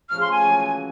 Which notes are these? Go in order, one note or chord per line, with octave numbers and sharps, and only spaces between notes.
C#3 F3 A3 F6
C6
G#5
E3 G#3 C#4 F#4